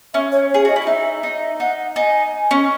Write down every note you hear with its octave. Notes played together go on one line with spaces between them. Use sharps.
C#4 E5
C#5
C#5
G#4
F#4 D#5
E4
D#5
D#4 E5
D#4
D#4 F#5
D#4 G#5
C#4